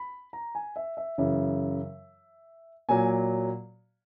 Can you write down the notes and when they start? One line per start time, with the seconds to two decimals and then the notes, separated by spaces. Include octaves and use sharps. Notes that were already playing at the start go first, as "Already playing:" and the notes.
Already playing: B5
0.33 A#5
0.55 G#5
0.76 E5
0.97 E5
1.18 F#2 C#3 E3 E5
2.89 A#2 F#3 G#5